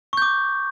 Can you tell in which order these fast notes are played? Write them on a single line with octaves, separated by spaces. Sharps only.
C#6 G6 D6